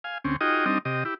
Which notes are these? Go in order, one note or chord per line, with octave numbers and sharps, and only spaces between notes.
F5 G#5
D2 C4 C#4
D#4 F4 F#4 G#4 D#5 G5
G3 C4 D4 D#4 D#5
C3 G4 D#5
E4 G4